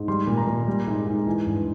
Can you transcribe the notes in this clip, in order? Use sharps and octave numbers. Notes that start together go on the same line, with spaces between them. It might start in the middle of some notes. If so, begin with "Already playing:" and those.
Already playing: G#2
G3 C6
A#2
A#5
A#2
G3
G#2
G#2
E3 G#5
G2